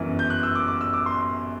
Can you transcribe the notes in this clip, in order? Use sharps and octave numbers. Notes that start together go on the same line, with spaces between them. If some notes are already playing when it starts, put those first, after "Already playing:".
Already playing: G1 F#2 E3
G6
F#6
E6
D6
D6
E6
D6
C6